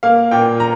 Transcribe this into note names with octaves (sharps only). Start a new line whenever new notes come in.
A#3 F5
A#2 G5
A#5